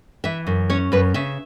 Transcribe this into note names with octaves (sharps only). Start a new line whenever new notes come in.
E3 E5
F#2
C#4 C#5
F#2 B4
C#3 E5